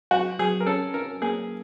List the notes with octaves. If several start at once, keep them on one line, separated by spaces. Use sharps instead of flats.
F#3 F#4
F#3 G#4
A#4
C#4 A4
C#4 A#4
A#3 G#4